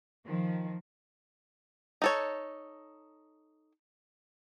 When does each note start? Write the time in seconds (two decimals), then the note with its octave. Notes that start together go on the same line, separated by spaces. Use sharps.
0.25 D#3 F3
2.02 D#4 A4 C#5